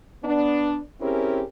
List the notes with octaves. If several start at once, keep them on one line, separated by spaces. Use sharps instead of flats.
B3 D4
C4 C#4 E4 G4 G#4 A#4